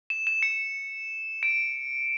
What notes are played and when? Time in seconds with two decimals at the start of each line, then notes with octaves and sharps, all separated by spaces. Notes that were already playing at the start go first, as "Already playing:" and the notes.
0.10 E7
0.27 E7
0.43 C#7
1.43 D7